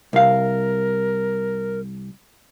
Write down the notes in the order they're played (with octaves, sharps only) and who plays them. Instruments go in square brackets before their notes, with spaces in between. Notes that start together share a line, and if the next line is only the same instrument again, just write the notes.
[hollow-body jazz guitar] C2 F5 [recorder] A#4